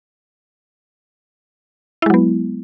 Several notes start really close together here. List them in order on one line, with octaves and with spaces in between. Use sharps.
E4 G#3 F#3 B3